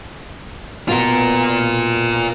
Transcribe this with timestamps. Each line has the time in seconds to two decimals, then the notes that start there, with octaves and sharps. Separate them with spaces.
0.88 B2 F4 A#4